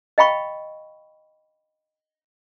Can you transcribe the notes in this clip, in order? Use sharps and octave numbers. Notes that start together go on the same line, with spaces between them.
D#5 F5 G5 B5 C#6